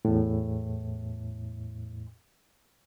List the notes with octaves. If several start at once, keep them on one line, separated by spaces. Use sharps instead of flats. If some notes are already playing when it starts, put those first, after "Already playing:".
E2 A2